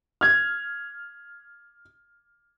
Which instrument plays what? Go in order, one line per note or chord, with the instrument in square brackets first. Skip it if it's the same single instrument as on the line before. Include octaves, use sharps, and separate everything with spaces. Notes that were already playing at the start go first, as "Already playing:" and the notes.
[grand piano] F6 G#6